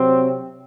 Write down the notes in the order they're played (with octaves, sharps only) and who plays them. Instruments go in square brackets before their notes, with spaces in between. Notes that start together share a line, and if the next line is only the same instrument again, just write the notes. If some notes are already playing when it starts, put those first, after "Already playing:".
Already playing: [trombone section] C3 F#3 C4